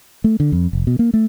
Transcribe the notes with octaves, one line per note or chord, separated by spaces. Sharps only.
A3
D3
F2
F1
B2
A#3
A3